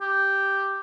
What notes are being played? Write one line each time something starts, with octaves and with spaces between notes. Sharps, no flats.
G4